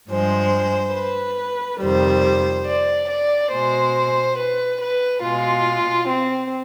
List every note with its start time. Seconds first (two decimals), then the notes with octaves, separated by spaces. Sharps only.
0.10 G2 F3 G#3 C5
0.95 B4
1.81 F2 C3 D#3 G3 C5
2.66 D5
3.09 D5
3.52 B2 G#3 C5
4.38 B4
4.81 B4
5.22 B2 G#3 F4
6.08 C4